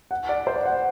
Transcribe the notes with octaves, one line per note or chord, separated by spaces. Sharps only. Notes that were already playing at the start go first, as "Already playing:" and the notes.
F#5
D5
C5
D5
F#5